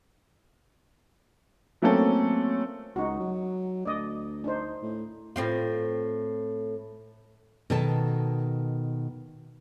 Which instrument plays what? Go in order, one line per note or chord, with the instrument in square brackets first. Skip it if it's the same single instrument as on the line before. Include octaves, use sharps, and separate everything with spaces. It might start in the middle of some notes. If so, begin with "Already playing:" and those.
[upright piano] F#3 A3 A#3 C4 C#4 A4
[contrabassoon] C#2 [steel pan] D#4 F#4
[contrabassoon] F#3
[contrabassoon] D2 [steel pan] D5 D#5
[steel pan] D4 D#4 C5
[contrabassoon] A2
[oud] A2 C4 F4
[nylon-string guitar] B2 D#3 A4 A5